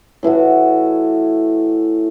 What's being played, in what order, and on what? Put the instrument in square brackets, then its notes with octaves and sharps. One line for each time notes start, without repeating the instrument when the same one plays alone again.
[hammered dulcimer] A2 E3 A3 F#4